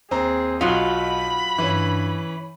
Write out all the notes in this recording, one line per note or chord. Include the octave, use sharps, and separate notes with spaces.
D#2 C4 G#4 A#5
B1 F#3 D#4 F4 B5 D#6
G2 E3 C#4